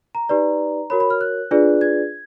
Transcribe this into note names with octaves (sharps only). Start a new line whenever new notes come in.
A#5
D#4 G4 B4 D5
F#4 A#4 C#5 B5
B5
F6
F#6
D4 F4 G#4 B4 D5
G#6